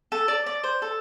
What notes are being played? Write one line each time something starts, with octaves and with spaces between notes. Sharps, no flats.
A4
D5
D5
C5
A4